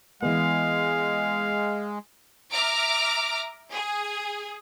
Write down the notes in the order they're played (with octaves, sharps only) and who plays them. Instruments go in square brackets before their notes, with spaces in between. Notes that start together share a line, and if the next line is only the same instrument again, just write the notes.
[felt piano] E3 B3 [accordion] G#3 [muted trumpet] F5
[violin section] E5 A#5 D6 F6 A#6 D7
G#4